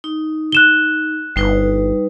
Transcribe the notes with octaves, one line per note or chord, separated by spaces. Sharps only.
D#4
F#6 E7 G7
G1 G3 D#4 B4